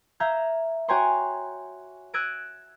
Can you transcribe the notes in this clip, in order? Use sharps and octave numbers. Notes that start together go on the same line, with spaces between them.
E5 F5 A#5 G6 G#6 A#6
F#4 C#5 G5 G#5 A#5 C6
E6 F#6 G#6 A#6 D7 D#7